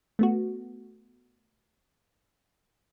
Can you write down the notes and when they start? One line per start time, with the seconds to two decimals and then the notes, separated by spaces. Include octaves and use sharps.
0.19 A3 B3 F#4